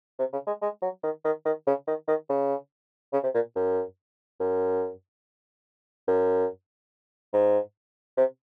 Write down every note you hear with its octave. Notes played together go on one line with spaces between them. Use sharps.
C3
C#3
G#3
G#3
F#3
D#3
D#3
D#3
C#3
D#3
D#3
C#3
C#3
C3
A#2
F#2
F#2
F#2
G#2
C3